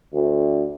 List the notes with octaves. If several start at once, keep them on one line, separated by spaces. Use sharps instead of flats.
D2